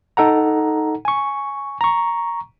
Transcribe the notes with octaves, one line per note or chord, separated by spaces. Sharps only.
D#4 A4 F#5 A#5
G#5 C#6
A#5 C#6